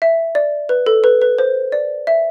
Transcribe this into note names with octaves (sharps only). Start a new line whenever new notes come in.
E5
D5
B4
A4
B4
B4
C5
D5
E5